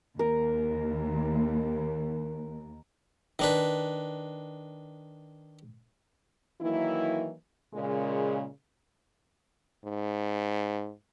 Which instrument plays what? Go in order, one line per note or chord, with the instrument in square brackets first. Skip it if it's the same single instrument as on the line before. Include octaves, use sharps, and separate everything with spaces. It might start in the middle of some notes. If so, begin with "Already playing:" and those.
[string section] D#2 [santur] A#4
[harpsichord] D#3 D4 B4
[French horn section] D#3 E3 F#3 A#3 E4
A#2 C#3 G#3
[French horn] G#2